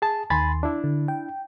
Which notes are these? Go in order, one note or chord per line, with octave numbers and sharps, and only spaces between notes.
G#4 A5
D#2 D#3 G#5 B5 C6 A6
D4 E4
D3
G5